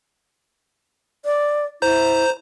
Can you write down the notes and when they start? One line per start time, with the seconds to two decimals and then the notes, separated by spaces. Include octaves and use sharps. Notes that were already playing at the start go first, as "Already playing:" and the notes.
1.25 D5
1.82 E4 C5 A#5 G6